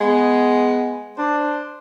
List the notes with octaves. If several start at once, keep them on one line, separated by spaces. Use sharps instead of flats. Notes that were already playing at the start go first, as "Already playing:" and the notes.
G#3 B3
D4 C5